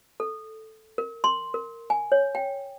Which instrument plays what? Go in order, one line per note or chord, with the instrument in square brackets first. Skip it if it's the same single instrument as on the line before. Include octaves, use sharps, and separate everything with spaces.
[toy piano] A4
A#4
C6
A#4
G#5
C#5
G5